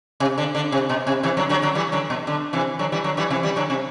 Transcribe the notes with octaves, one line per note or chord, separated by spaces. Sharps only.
C3
D3
D3
C3
B2
C3
C3 E3
D3 F#3
D3 F#3
D3 F#3
E3 G3
D3 F#3
B2
D3
C3 E3
D3 F#3
E3 G3
D3 F#3
E3 G3
C3 E3
E3 G3
D3 F#3
C3